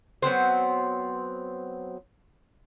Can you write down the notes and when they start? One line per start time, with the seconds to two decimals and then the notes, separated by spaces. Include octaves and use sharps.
0.22 F#3 B3 C4 C5